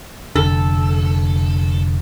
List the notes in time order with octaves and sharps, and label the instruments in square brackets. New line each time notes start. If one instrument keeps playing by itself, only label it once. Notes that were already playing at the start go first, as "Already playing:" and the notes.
[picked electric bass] F1 D3 [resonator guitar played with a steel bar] A4